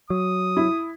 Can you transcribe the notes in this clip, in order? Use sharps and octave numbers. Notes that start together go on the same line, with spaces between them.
F#3 D#6
E4